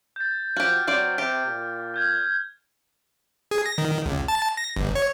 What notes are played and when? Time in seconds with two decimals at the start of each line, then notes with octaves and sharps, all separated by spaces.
0.16 G6 A6
0.56 F3 F#4 G4 F6
0.87 F#3 C4 C5 D5
1.18 C3 G4
1.47 A#2
1.94 F6 G6 G#6
3.51 G#4
3.66 A#6
3.78 D#3
4.05 C#2
4.28 A5
4.57 A#6
4.76 G1
4.95 C#5